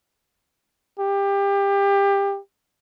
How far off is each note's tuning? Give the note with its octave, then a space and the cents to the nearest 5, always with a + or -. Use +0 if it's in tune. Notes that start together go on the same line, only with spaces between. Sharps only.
G4 +25